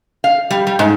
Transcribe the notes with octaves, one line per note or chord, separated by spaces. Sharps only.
F5
G3
G3
G#2